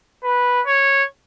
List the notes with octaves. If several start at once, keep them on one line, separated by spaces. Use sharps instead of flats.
B4
C#5